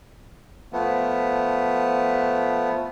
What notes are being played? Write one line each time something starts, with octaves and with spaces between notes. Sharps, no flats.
F3 A3 B3